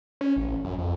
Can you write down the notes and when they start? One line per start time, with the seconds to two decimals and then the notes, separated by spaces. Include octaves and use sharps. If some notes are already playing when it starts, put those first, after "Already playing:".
0.21 C#4
0.37 A1
0.65 F#2
0.79 F2